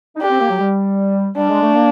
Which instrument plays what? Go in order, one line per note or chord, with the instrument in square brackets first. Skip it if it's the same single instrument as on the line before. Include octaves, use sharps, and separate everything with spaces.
[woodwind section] D#4
[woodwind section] D4 [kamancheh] G4
[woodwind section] C4
A#3
F#3
G3
[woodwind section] G3 [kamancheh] D4
[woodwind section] G#3
A3
A#3